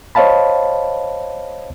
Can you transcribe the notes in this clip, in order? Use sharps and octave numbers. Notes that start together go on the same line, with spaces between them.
C5 C#5 D#5 F5 A5 B5